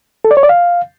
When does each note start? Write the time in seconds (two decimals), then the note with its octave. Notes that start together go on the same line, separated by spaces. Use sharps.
0.25 A4
0.31 D5
0.37 C#5
0.43 D5
0.49 F5